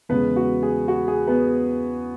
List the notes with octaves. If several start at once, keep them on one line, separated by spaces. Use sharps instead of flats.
E2 C#3 G#3 B3 B4
F#4
G#4
F#4
G#4
B3 B4